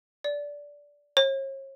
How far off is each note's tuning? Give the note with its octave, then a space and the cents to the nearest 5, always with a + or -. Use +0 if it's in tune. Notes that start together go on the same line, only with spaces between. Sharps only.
D5 -15
C#5 -40